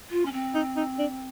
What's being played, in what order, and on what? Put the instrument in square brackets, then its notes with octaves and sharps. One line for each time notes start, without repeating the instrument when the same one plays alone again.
[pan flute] F4
C#4
C4
[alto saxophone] D#4
D#4
D4